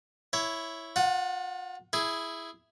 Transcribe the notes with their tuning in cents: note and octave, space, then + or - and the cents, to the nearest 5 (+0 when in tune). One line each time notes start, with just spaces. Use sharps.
E4 +0 C#5 +0
F4 +35 F#5 +0
E4 +0 G#4 +0